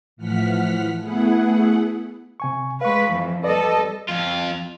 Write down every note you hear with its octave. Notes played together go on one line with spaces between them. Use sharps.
A2 E3 F3 F#5 F6 B6
A3 B3 E4 G#4 F#5
C3 G#5 C#6
G#3 B4 F5 C#6
F2 E3
G3 A4 B4 D5 D#5
F2 F4